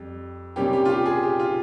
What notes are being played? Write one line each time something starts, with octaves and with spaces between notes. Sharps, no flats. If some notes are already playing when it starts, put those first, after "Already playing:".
Already playing: F2 G3
C3 G3 A#3 C#4 G4
G4
F4
G4
G#4
G4
F4